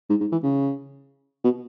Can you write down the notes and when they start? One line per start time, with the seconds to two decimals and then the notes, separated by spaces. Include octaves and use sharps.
0.09 G#2
0.20 G#2
0.32 E3
0.43 C#3
1.44 B2